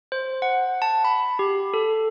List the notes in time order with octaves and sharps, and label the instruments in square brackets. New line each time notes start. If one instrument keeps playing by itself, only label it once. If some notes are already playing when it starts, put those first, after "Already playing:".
[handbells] C5
F#5
A5
B5
G4
A4